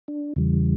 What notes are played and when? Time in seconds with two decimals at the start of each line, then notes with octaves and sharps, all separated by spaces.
0.08 D4
0.36 E2 C#3 E3 G3